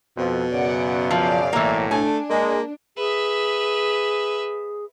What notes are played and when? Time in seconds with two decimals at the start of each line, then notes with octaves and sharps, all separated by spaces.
0.17 F2 B2
0.52 F#2 C#3 D5 F#5
1.11 F3 D5 F5
1.53 B1 A2 E3 A#3
1.91 A3 D4 G#5
2.30 G#3 A#3
2.97 G#4 B4 E5